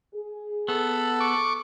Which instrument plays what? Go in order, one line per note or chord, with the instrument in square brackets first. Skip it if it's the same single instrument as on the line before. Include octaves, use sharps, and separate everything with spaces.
[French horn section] G#4
[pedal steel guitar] B3 [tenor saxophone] A4
[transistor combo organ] C#6 D6